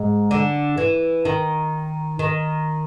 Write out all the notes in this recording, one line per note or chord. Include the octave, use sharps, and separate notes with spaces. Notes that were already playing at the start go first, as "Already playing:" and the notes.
Already playing: G#2
D3
E3
D#3
D#3